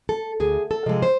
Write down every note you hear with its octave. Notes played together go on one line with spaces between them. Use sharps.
A4
D2 G#4
A4
C3 F3 G#3
C5